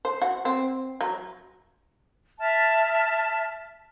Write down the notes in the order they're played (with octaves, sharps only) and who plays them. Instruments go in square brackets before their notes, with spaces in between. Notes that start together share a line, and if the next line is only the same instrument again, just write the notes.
[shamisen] C5
F#4
C4
F#3
[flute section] E5 A5 F6